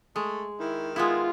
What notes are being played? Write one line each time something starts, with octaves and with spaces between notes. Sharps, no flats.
G#3 A3
D#3 E4
G#3 B3 E4 F4